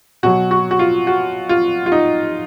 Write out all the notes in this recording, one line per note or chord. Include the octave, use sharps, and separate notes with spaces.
B2 F#3 F#4
F#4
F#4
F4
F#4
F4
F4
D#4